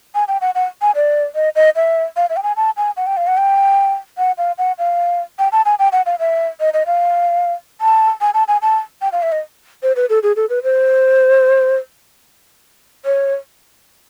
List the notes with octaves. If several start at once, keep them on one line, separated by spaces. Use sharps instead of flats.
G#5
G5
F#5
F#5
G#5
D5
D#5
D#5
E5
F5
E5
G5
G#5
A5
G#5
F#5
G5
F5
F#5
G5
F#5
F5
F#5
F5
G5
A5
G#5
G5
F#5
F5
E5
D#5
D#5
F5
A5
G#5
A5
G#5
A5
G5
F5
E5
D#5
C5
B4
A4
G#4
A4
B4
C5
C#5